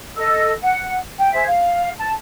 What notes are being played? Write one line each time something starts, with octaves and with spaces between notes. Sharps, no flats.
A4 D#5 E6
F#5
G5
G#4 C5 E5
F5
A5